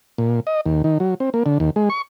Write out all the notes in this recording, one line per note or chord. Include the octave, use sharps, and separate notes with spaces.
A#2
D#5
D#2
D#3
F#3
C4
A#3
D3
D#2
G#3
C#6